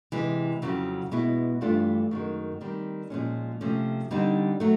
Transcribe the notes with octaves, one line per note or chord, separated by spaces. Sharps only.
C3 E3 G#3
F2 C#3 F#3
B2 G#3 B3 E4
G2 E3 A3 D4 F4
F#2 D#3 G#3
D#3 G3 C4
A#2 F3 G#3 C#4
C3 F3 A3 C#4
D3 G3 C4 D#4
F#3 A3